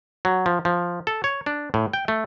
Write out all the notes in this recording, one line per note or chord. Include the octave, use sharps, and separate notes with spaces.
F#3
F3
F3
A4
C#5
D4
A2
G5
A3